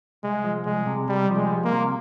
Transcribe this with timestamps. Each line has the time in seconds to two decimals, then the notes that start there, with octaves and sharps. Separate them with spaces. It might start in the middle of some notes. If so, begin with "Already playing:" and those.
0.23 C2 G#3
0.44 F3
0.66 C2 G#3
0.87 C3
1.08 C2 G3
1.30 F3
1.37 G#3
1.51 C2
1.64 A#3
1.72 C3